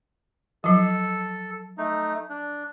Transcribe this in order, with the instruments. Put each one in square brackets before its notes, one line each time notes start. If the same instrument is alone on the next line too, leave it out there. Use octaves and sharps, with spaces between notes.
[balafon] F3 F#3 [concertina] A4
[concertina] A3 D#4
D4